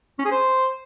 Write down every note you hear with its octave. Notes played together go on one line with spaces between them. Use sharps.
C#4
G#4
C5